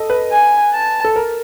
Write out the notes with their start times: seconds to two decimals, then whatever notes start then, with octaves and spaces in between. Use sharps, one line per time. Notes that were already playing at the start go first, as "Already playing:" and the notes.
Already playing: A4 D#5
0.10 B4
0.31 G#5
0.73 A5
1.05 A4
1.16 A#4